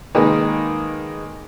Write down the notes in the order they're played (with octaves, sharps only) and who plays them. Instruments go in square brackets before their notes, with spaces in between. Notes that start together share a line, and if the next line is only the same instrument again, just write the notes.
[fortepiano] D#3 G#3 A#3 D#4 B4